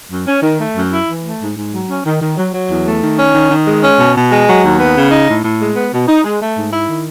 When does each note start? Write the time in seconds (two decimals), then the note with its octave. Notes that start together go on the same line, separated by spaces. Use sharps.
0.10 F#2
0.26 C#4
0.42 D#3
0.59 A3
0.75 F#2
0.91 E4
1.07 E3
1.23 A3
1.40 G#2
1.56 G#2
1.72 F#3
1.88 C#4
2.05 D#3
2.20 D#3
2.37 F#3
2.53 F#3
2.69 E2
2.85 A3
3.01 D#3
3.17 C#4
3.33 D#3
3.49 D#3
3.65 G#3
3.82 C#4
3.98 B2
4.14 B2
4.30 G#3
4.46 F#3
4.62 D#2
4.78 B3
4.95 C#3
5.11 D#4
5.27 A2
5.43 A2
5.59 G#3
5.75 B3
5.92 B2
6.07 D#4
6.24 G#3
6.40 A3
6.56 G#2
6.72 E4
6.88 D#3